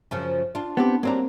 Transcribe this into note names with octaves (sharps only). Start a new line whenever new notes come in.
F#2 C#3 F3
D4 F4
B3 C4 G4
F#3 G3 A#3 C4 D4 A#5